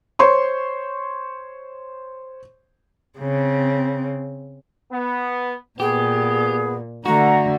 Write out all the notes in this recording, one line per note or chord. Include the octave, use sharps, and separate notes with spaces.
C5 C#5 C6 C#6
C#3 C4
B3
A#2 B3 G4 G#4
D3 A3 F#4 F#5 A#5